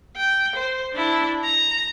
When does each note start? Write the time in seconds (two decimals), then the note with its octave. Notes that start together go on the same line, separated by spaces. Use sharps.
0.16 G5
0.56 C5
0.94 D4 E4
1.44 A#5